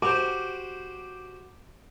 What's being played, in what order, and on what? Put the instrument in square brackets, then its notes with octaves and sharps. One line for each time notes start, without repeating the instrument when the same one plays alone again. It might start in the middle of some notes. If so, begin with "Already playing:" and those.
[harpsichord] F#4 G4 C5 [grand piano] D6